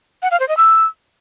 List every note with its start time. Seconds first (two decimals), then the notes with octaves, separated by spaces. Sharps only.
0.22 F#5
0.31 F5
0.40 C5
0.48 D#5
0.57 E6